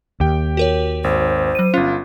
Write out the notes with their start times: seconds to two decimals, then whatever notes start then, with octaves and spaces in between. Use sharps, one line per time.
0.20 D#2 G4 G5
0.57 F#4 A#4 C#5
1.04 G#1 C5
1.55 F#3 D#7
1.74 G1 C#4 F4